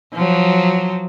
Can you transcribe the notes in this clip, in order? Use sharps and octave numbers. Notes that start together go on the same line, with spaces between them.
F3 F#3